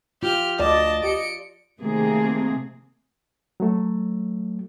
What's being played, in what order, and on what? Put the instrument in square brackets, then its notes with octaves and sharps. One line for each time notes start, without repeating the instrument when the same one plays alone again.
[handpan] F4 [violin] G4 F6
[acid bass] D2 [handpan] D5 [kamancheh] D#5 [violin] A5
[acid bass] G4 [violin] C#7 D7
[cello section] C3 D#3 A3 A#3 C4 G#4
[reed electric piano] F#3 A3